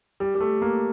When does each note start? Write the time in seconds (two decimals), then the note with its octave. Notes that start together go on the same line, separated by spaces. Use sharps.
0.20 G3
0.35 G3
0.40 A3
0.62 A#3